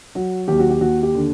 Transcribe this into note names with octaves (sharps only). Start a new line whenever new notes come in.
F#3 F#4
D#2 G4
F#4
G4
D#2 F#4
G4
D3